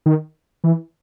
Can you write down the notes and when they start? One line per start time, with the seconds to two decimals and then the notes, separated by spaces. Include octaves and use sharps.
0.06 D#3
0.64 E3